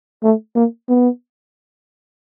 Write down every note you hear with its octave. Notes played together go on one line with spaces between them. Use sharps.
A3
A#3
B3